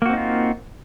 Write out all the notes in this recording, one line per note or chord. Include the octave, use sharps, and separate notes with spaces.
A#3 C4 D#4 F4 F#4